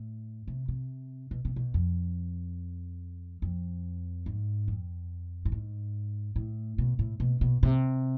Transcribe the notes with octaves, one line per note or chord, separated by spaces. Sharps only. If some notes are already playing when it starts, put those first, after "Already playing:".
Already playing: A2
C3
C3
B2
C3
B2
F2
F2
G#2
F2
A2
G#2
A2
B2
A2
B2
B2
C3